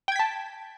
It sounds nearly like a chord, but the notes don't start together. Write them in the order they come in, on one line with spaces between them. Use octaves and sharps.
G5 G#6 B6 A5